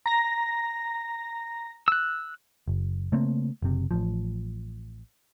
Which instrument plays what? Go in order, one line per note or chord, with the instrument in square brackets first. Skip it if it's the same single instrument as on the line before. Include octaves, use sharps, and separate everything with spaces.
[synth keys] A#5 A#6
[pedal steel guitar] E6 F#6
[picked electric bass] F#1
C#3 A3 A#3 C4
F#1 C3
A1 F3